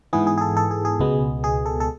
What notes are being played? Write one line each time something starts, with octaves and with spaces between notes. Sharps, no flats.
G#2 E3 B3 G#4
G#4
G#4
A4
A4
G#4
G#4
C#2 B2 G#3 B3
G#4
A4
A4